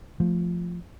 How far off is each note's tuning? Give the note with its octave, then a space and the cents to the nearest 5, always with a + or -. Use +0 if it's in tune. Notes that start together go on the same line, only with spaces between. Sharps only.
F3 +0 A3 +0